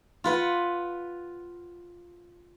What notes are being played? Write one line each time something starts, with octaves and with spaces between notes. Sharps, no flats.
F4 B4 F#5